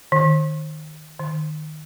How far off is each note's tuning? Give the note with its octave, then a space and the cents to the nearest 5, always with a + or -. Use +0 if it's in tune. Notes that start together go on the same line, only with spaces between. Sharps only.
D#3 -10
D#3 -15